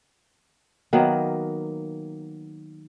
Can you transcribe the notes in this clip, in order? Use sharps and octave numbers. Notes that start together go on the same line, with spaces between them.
D#3 F#3 A#3 B3